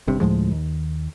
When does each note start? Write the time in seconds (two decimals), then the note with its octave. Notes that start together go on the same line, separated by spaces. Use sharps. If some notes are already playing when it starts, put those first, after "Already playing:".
0.07 G1 G2 C3
0.20 D2 A2 F3 G#3
0.51 D#2